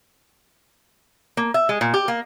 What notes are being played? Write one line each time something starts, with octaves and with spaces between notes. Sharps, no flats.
A#3
E5
G#3
A#2
G4
A#3